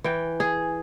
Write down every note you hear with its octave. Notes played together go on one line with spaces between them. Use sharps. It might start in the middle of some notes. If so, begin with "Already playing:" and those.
E3 G5
G#4